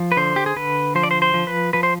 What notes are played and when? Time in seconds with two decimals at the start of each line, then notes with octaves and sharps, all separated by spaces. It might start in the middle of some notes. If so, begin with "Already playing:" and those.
Already playing: F3
0.12 B4
0.17 D3 C5
0.36 G4
0.46 G#4
0.56 D3 B4
0.95 F3 C5
1.03 D5
1.11 C5
1.22 C5
1.34 F3
1.47 B4
1.73 F3 B4
1.83 C5